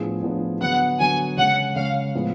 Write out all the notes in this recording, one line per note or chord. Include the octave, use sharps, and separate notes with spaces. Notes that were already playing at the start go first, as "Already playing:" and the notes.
Already playing: A2 F3 B3 D4 G#4
A2 F3 B3 D4 G#4
D3 F#3 B3 F#5
D3 F#3 B3 G#5
C#3 G#3 C#4 F#5
C#3 G#3 C#4 F5
A2 F3 G#3 B3